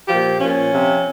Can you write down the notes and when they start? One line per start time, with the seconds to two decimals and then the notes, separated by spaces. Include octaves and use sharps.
0.08 A#2 F3 G4
0.40 A#2 F3 C#4
0.71 C3 F3